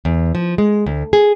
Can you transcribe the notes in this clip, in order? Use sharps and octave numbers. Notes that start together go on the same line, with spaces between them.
E2
F3
G#3
D2
G#4